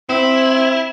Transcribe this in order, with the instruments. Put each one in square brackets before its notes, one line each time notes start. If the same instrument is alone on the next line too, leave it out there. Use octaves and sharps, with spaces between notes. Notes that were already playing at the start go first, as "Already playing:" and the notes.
[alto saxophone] C4 [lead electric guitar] E4